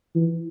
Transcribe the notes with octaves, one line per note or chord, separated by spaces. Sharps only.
E3